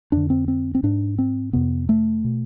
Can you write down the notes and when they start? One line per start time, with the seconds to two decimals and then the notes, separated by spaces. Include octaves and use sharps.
0.12 F2 D3 D4
0.30 C4
0.48 C4
0.75 C4
0.83 G#2 D4
1.18 C4
1.53 F2 C3 B3
1.89 A3
2.24 B2